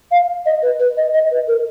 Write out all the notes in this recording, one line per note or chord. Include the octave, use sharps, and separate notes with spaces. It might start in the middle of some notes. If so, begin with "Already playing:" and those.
F5
D#5
B4
B4
D#5
D#5
B4
A#4